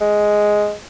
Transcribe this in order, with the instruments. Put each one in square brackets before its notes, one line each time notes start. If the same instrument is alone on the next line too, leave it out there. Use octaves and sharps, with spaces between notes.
[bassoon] G#3